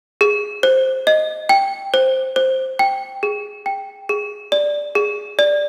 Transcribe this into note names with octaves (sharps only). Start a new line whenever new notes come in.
G#4
C5
D#5
G5
C5
C5
G5
G#4
G5
G#4
D5
G#4
D5